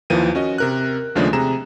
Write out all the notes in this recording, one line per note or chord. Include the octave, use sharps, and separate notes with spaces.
D#2 E3 F3 A#4 D#7
C#4 F#4 D#5
C3 A#4 F#6
D#2 C#3 F3 G#3 A3 D4
C3 G#4 A#5 E7